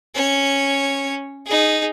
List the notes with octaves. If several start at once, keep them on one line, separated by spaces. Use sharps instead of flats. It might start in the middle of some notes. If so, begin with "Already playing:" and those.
C#4 C#5
D#4 G#4